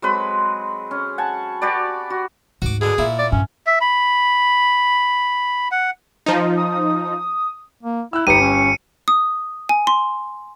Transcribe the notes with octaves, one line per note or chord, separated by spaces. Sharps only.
F#3 G#3 C4 B4
C#4
F#5 G#5 A5
F#4 G4 B4 D5
F#4
D2 G#2 F#4 D6
B2 D3 G#4
A#2 A#3 E4
D5
G2 C#4
E5
B5
F#5
F3 D#4
D#6
A#3
E4 E6 F#6
G1 D#4 G4 B4 C#7 D#7
C#4
D#6
G#5
C6